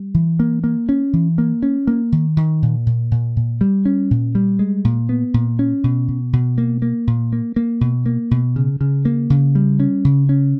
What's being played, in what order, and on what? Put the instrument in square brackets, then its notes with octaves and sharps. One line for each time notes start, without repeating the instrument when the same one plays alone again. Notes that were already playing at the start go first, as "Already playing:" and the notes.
Already playing: [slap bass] G3
E3
A#3
A#3
C#4
E3
A#3
C#4
A#3
D#3
D#3
A#2
A#2
A#2
A#2
G3
C#4
A#2
G3
G#3
A#2
B3
A#2
C#4
B2
B2
B2
A#3
A#3
A#2
A#3
A#3
B2
A#3
B2
C#3
C#3
A#3
C#3
G3
C#4
C#3
C#4